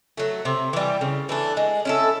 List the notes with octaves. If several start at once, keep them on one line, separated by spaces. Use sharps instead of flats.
F#3 A3
C3
E3 G3
C#3
E3 A3 D4
G#3
C#4 E4 A4